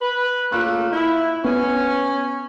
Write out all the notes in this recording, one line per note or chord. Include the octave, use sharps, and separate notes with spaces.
B4
C#3 A3 A#3 F4 F#6
E4
B3 C#4